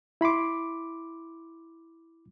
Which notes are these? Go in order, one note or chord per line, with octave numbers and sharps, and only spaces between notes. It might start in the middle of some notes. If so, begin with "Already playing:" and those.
E4 B5 C6 D6